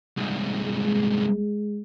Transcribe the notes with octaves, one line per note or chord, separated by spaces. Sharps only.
C2 G#2
G#3